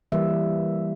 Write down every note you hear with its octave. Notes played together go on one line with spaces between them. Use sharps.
E3 G3 A#3 E5